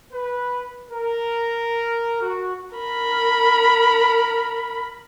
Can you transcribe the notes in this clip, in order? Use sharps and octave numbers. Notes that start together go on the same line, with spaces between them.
B4
A#4
F#4
A#4 B5